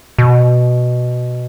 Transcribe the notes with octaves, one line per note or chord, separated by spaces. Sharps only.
B2